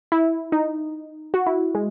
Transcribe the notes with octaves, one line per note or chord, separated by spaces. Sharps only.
E4
D#4
F#4
E4
G#3